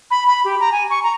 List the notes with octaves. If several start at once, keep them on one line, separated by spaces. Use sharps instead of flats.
B5
B5
G4
A#5
G#5
C#6
A#5